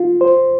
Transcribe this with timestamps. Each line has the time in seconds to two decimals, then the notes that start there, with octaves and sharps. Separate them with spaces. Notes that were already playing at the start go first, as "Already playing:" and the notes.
Already playing: F4
0.21 C5